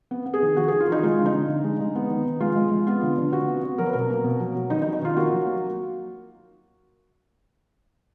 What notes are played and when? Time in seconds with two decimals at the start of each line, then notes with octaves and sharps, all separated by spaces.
0.11 B3
0.26 B3
0.34 G#4
0.42 D#3
0.57 D#3 F#4
0.68 D#3 G#4
0.80 F4
0.88 D#3 D#4
1.03 G#3 F4
1.19 D3
1.26 D#4
1.34 D3
1.48 D3
1.64 G#3
1.80 G#3
1.95 B3
2.10 D#3
2.25 D#3
2.40 G#3 F4
2.56 G#3
2.71 G#3
2.87 B3 F4
3.03 D3
3.18 D3
3.32 D3 F#4
3.48 B3
3.63 B3
3.78 F#3 A#4
3.86 B4
3.93 B2 A#4
4.10 A#3
4.24 B2
4.40 F#3
4.55 F#3
4.70 D#3 D#4
4.82 D#4
4.86 D#3
4.93 D#4
5.02 D#3 F4
5.16 A#3 F#4
5.33 F#3
5.47 A#3